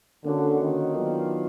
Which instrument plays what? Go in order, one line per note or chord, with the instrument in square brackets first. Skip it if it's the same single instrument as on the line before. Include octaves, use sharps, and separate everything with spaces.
[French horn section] D3 [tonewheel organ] A#3 C#4 F#4
[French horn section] D#3
[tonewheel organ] F#3 B3 D4 F4